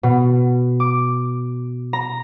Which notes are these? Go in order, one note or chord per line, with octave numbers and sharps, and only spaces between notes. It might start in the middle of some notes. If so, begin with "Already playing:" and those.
B2
D6
A#5